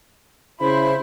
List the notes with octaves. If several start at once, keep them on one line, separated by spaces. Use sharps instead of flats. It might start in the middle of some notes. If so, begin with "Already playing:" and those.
C#3 E4 C5 B5